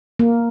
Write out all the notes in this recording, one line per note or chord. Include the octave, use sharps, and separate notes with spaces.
A#3